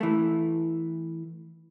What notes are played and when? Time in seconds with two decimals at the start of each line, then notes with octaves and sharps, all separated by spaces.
0.01 E3 A3